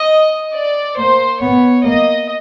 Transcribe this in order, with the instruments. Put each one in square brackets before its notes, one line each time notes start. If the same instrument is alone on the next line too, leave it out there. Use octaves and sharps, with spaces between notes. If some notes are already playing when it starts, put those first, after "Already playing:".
Already playing: [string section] D#5
D5
[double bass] A#3 [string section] C5
[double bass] B3 [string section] C#5
[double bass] A#3 [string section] D#5